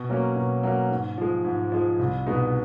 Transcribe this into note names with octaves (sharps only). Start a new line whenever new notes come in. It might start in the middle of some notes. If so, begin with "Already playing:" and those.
Already playing: B2
F#3 A#3 C#4
B2
F#3 A#3 C#4
G#2
F3 G#3
G#2
F3 G#3
C2
B2 G#3 B3 D#4